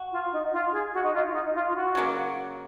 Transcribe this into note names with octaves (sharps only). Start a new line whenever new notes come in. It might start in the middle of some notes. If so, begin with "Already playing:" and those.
Already playing: F#4
F4
D#4
F4
G#4
F#4
D#4
F4
F4
D#4
F4
F4
F#4
C#3 F#3 A#3